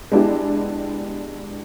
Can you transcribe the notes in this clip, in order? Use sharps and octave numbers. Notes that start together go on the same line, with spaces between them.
G#3 B3 D4 E4 G4 G#4